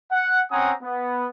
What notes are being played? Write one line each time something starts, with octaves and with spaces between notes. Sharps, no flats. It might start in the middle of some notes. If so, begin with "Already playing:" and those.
F#5
C4 C#4 F#5 G#5 A#5 D#6
B3